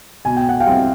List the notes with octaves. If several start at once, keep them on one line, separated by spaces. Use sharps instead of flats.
B2 G#5
G5
F#5
F5 G5
G3 C4 E4